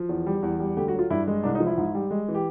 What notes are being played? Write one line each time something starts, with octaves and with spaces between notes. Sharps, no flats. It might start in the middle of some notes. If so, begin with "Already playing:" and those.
Already playing: F3
E2
G3
E2
G3
D2 G4
F#4
F#3
F4
G2 E4
G#3
C2 D4
D#4
F3
E4
G#2
G3
G#3
E3
G4